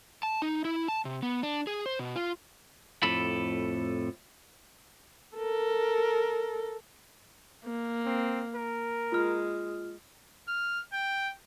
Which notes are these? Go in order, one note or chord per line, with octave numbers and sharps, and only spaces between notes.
A5
D#4
E4
A5
C3
B3
D4
G#4
C5
B2
F4
F2 A2 A4 B5
A4 A#4
A#3
C4
A#4
G#3 F4 F6
F6
G5